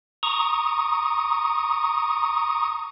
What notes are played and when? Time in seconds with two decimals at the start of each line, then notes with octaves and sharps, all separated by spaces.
0.23 A#5 C#6 D#6